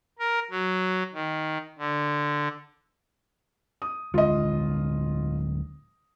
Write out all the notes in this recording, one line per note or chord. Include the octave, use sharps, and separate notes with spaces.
A#4
F#3
D#3
D3
D#6
D1 D3 G#3 F4 D#5